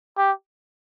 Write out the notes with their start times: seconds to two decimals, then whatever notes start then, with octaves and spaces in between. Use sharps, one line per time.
0.17 G4